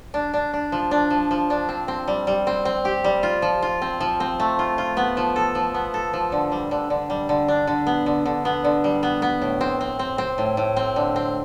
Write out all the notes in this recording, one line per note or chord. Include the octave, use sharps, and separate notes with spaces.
D4
D4
D4
F3
D4
F3
F3
D4
C4
C4
G3
G3
C4
C4
G4
G3
F4
F3
F4
C4
F3
C4
A3
F4
F4
B3
F3
A4
F3
B3
A4
F3
D3
G3
D3
D3
G3
D3
D4
D3
B3
D3
D3
B3
D3
G3
B3
B3
A2
C4
C4
C4
C4
A2
A2
C4
D3
C4